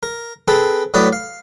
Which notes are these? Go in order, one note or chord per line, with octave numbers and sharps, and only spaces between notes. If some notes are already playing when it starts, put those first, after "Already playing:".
A#4
C4 G#4 A4 B4
A2 F#3 B4 D5 D#6
F5